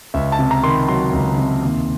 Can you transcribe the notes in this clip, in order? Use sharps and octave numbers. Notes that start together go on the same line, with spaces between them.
C#2 E5
A5
C3
A#5
D#3 C6
B5
F#3 C6
C#2
C3
D#2